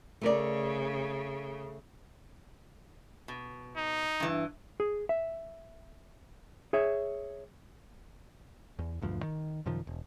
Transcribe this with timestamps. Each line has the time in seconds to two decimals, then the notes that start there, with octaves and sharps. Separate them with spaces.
0.21 C#3 A3 A#4 D5
3.28 B2
3.77 D#4
4.20 G2 E3
4.80 G#4
5.09 E5
6.73 G#4 C#5 E5
8.79 E2
9.02 E1 D2 G2 F3
9.23 D#3
9.66 F#2 C3 D#3 F3
9.87 E1